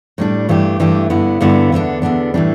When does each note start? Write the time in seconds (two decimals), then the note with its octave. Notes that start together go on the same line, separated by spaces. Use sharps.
0.18 A2 G3 D4
0.49 G2 E3 A3 D4 G4
0.80 G2 E3 A3 D4 G4
1.10 G2 D3 B3 E4
1.41 G2 D3 B3 E4
1.72 E2 D3 B3 D4
2.02 E2 D3 B3 D4
2.34 A2 E3 G3 D4